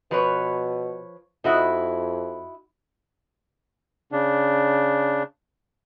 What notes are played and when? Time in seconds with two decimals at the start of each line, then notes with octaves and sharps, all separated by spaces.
0.11 B2 F3 B4 C#5
1.44 F2 D#4 E4 F#4
4.12 C#3 D4